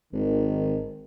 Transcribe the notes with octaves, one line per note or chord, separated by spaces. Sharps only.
G#1 D#3